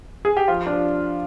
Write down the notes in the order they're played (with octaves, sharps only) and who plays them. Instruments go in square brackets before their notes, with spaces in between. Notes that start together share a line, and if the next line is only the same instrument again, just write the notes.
[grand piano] G#4
G4
F3 F4
D4
F3